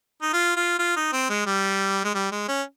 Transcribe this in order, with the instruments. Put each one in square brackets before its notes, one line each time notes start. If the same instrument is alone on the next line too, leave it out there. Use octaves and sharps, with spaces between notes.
[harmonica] D#4
F4
F4
F4
D#4
C4
G#3
G3
G#3
G3
G#3
C#4